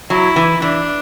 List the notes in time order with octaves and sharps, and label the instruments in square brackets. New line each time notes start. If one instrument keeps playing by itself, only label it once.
[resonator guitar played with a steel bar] F#3 [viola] E4
[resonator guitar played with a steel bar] E3
[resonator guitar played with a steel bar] E3 [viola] D4